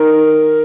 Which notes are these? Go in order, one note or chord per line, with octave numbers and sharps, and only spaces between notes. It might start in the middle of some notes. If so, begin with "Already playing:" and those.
Already playing: D#3 A#4